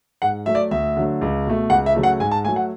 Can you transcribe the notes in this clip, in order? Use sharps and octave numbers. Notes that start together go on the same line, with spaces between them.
G#2 F#5
F#3 A3 E5
D5
D2 E5
D3 F#3 A3
C#2
B2 A3
C#2 F#5
E5
C#3 F#3 A3
F#5
G#2 G#5
A5
F#3 A3 G#5
F#5